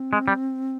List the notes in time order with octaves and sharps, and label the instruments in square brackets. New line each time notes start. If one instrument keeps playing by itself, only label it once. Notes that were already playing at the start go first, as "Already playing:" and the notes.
Already playing: [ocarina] C4
[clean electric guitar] G#3
G3